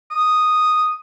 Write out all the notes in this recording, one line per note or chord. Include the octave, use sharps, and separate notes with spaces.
D#6